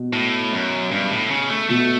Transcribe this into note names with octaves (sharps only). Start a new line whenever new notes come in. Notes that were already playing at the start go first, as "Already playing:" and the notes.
Already playing: B2
A2
F#2
G2
A2
C#3
A3
B2 A3